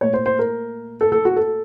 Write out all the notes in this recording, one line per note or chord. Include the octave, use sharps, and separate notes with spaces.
A#2 A3 C#5
C5
C5
A#4
A4
A4
F#4
A4